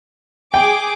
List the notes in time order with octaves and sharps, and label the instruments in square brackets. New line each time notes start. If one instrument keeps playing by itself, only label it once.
[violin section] G#4 D6 [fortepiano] G5